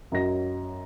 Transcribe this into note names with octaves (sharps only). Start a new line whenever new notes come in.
F#2 F#3 D#5 A#6